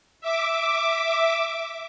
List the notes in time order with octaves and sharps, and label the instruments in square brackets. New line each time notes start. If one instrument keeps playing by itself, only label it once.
[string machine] E5 D6